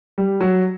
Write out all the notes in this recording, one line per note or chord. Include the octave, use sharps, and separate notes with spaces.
G3
F#3